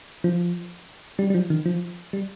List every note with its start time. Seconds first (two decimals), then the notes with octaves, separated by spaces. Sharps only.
0.24 F3
1.19 G3
1.30 G3
1.34 F3
1.50 D#3
1.66 F3
2.13 G3